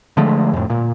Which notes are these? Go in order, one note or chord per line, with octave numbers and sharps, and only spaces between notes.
D3 F3 G#3 A3
F2 A2
A#2